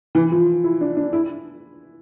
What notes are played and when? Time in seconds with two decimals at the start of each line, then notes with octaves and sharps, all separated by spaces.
0.15 E3
0.32 F3
0.64 E4
0.81 D4
0.97 D4
1.13 E4